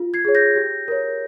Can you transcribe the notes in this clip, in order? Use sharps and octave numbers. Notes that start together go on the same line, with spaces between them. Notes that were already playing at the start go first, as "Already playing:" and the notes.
Already playing: F4
G#6 C7
G#4 C#5
G6 A#6
G4
A#4 C#5